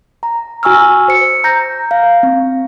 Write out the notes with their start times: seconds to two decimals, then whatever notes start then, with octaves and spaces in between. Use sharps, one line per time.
0.23 A#5
0.63 F#4 G#5 C#6 E6 F6
1.08 C5 C#7
1.44 A#5 G6 A#6
1.91 F5
2.23 C4